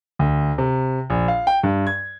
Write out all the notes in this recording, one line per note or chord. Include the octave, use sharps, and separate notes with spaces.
D2
C3
A#1
F5
G5
G2
G#6